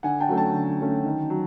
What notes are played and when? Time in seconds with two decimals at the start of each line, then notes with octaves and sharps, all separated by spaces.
0.03 D3 F#5 G#5
0.20 G5 A5
0.28 F#3 A3 C#4
0.37 G5 A5
0.54 D3
0.80 F#3 A3 C#4
1.04 D#3
1.30 F#3